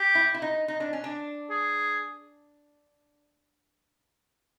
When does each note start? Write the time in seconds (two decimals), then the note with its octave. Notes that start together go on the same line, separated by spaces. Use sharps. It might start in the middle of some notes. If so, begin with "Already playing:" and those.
Already playing: G4
0.15 E4
0.34 E4
0.42 D#4
0.68 D#4
0.80 D4
0.93 C#4
1.04 D4
1.50 G#4